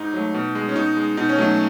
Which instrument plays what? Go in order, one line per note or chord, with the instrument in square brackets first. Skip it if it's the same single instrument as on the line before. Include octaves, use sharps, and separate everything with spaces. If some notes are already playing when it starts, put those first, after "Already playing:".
Already playing: [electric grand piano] G#2 D#4
F#3 A3
B2
G#3
C#4
B2 D#4
G#3
B2 D#4
C#4
F#3 A3 D#4